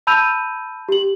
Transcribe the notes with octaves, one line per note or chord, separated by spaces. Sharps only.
A5 B5 E6 G6 D#7 F7
G4 F#7